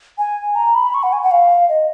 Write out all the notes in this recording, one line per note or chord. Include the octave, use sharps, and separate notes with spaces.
G#5
A#5
B5
C#6
F#5
G#5
F#5
F5
D#5